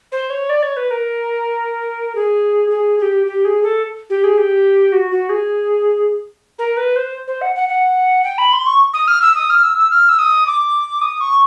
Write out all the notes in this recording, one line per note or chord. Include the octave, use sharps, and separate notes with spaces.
C5
C#5
D5
C#5
B4
A#4
G#4
G#4
G#4
G4
G4
G#4
A4
G4
G#4
G4
F#4
F#4
G#4
A#4
B4
C5
C5
F#5
F#5
F#5
G5
B5
C6
C#6
D#6
F6
E6
D#6
F6
E6
E6
F6
E6
D#6
D6
D#6
C#6